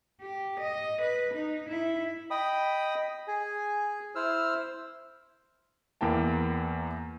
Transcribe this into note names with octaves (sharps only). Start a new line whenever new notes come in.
G4
D#5
B4
D#4
E4
D#5 G5 B5 D#6
G#4 G#5
E4 C5 E6 F6
E2 A#3 E4 G5 A5